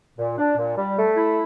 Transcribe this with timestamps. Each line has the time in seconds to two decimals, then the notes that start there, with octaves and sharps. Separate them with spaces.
0.18 A#2
0.38 D4
0.57 A#2
0.77 G3
0.97 A3
1.17 E4